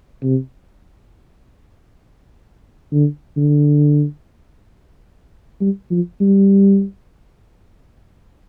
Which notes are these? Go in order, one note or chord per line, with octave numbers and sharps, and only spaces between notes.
C3
D3
D3
G3
F3
G3